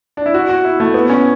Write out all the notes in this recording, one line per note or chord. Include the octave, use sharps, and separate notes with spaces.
D4
E4
F#4
F#4
E4
A3
B3
C#4